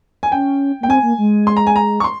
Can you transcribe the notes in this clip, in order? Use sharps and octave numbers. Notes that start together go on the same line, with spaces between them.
G#5
C#4 G5
A#3 G5
C4 G#5
A#3
G#3
C6
A#5
G#5
A#5
C#6
C6